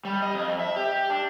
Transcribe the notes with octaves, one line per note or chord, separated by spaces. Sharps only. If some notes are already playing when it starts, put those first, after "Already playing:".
G3
D#5
F2
E5
G4
D4